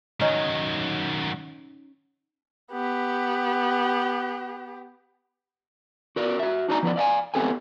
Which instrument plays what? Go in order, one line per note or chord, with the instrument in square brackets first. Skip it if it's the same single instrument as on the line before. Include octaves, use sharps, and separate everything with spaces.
[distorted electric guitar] D#3 F#3 [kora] C#4 D#4
[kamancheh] B3 G4
[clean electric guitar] F#4 A#4 D5
F#4 E5
D4 D#4 F#4 D5 G#5 A#5
F3 B3 E4 D5
D5 F5 G5 G#5
B3 C4 G4 A4 G5 G#5